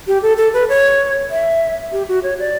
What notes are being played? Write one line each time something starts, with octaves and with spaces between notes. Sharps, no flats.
G4
A4
A4
B4
C#5
E5
G4
F#4
C#5
D5